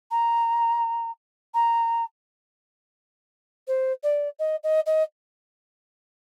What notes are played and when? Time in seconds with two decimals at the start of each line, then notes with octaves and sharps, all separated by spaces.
0.11 A#5
1.54 A#5
3.67 C5
4.03 D5
4.39 D#5
4.64 D#5
4.86 D#5